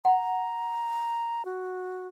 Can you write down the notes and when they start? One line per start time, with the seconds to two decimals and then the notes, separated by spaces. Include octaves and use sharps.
0.05 F#5 A#5
1.45 F#4